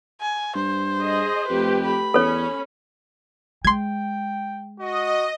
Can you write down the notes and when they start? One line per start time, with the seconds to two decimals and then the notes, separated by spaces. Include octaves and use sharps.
0.21 G#5
0.55 G2 C5
1.01 G#4 D#5
1.50 F2 A3 G4 B4
1.85 B5
2.14 E2 C#4 A4 C#5
3.65 G#3 G5 C6 G#6
4.79 F#4 D#5